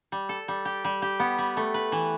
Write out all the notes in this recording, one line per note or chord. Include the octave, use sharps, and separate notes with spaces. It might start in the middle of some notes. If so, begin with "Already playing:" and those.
G3
A4
G3
G4
G3
G4
B3
G3
A3
B4
E3